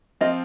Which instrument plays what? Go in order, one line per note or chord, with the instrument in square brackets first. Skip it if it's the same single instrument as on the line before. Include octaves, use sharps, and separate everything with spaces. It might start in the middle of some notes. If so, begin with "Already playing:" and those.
[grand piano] F3 C4 F4 [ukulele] D#5